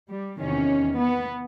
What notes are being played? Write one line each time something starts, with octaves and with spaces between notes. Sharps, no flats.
G3
E2 C3 D#3 C#4
B3